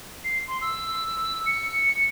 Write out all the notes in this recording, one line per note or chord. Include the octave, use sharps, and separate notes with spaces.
C7
C6
E6
C#7